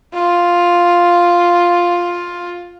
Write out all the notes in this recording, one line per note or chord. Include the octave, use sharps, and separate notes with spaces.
F4